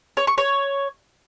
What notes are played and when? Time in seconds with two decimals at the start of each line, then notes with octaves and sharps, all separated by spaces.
0.17 C#5
0.27 C#6
0.38 C#5